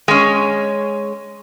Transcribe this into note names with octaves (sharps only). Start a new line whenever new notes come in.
G#3 C#4